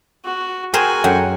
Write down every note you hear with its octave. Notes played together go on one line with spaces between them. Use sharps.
F#4
F#4 G#4 A#4 C5 G5 G#5
F#2 A4 F#5 G5